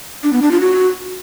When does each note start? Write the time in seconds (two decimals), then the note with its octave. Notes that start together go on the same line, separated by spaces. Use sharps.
0.23 D4
0.33 B3
0.42 D4
0.51 F4
0.61 F#4